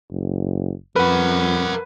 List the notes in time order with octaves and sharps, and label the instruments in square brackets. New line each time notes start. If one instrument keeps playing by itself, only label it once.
[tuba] F#1
[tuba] F2 [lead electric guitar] A#4 F#5 [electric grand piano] B4